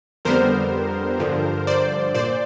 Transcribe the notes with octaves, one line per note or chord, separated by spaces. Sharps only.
F2 D3 G3 B3 A#4 C5
G2 D3 F3
C5 D5
A#2 C5 D5